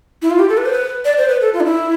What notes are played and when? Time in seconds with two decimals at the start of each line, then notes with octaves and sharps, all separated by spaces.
0.22 E4
0.31 F4
0.39 G4
0.49 A4
0.57 B4
0.66 C5
0.73 B4
1.05 D5
1.18 C5
1.29 B4
1.41 A4
1.53 F4
1.60 D4
1.65 E4